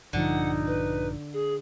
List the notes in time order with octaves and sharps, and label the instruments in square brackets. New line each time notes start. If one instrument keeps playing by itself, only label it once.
[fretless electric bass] A#1 G2 F3 [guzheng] D3 [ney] D#4 [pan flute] F#5
[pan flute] B4
G#4